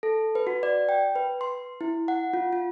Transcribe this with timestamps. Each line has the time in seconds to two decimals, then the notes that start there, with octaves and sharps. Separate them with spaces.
0.03 A4
0.35 B4
0.47 F#4
0.63 D5
0.89 G5
1.16 B4
1.41 C6
1.81 E4
2.08 F#5
2.33 F4
2.53 F4